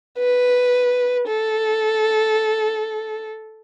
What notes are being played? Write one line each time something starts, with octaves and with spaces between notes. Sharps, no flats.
B4
A4